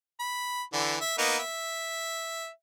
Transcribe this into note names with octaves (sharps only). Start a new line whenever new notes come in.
B5
D3 E3
E5
A#3 B3 D#4
E5